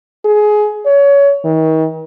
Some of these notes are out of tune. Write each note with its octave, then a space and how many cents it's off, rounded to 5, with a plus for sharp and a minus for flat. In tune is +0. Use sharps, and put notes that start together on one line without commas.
G#4 +20
C#5 +25
D#3 +40